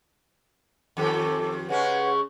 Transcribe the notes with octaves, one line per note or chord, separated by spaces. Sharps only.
F2 D#3 G4 A4 D6
C#3 G#3 C#4 B4 C#5 F#5